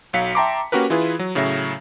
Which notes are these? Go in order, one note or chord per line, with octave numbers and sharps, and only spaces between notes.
B1 F#3 F5 B6 C#7
E5 G5 A5 A#5 C6 D6
A#3 C#4 F#4 G4 A#4 B4
E3 E4 F4 G#4 B4
F#3
A2 C#3 F#3 C#5 E5 A#6